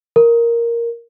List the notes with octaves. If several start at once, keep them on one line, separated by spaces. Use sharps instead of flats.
A#4